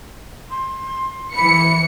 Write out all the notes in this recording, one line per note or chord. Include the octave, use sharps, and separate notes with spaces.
C6
E3 B5 C#7